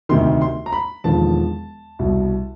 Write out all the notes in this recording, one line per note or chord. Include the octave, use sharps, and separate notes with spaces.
D2 C3 D#3 C6
C6
A#5
B5
E1 D#2 D3 F3 A5
C2 B2